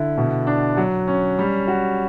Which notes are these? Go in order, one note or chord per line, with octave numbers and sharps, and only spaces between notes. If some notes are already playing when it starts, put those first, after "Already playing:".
Already playing: D3 E4
B2
D4
F#3
C#4
G3
F#4